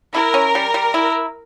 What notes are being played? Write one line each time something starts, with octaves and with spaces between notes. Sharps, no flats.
E4 A#4
C#4
G3
G3
E4